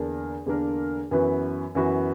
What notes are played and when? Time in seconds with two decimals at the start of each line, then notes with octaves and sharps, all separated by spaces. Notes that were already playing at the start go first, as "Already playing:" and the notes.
Already playing: E2 D3 A#3 D4 A#4
0.46 E2 D3 A#3 D4 A#4
1.11 F#2 E3 B3 F#4 B4
1.75 F#2 E3 B3 F#4 B4